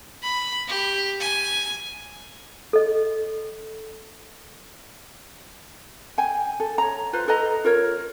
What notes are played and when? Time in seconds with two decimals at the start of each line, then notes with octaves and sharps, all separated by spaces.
0.23 B5
0.68 G4
1.20 G#5
2.73 A4 D#5
6.18 G5 G#5
6.60 A4
6.78 C#5 A#5
7.13 F4 B4 C5
7.28 A4 B4 D#5 A#5
7.64 F4 A#4 C#5